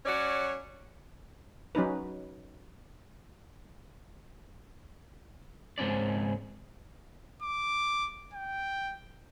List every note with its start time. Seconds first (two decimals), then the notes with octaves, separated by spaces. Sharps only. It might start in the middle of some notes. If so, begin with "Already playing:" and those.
0.06 F#3 C#4 F#4 C#5 D5
1.75 F#3 C#4 D#4 B4
5.78 C#2 G#2 C4 C#4 D5
7.42 D6
8.34 G5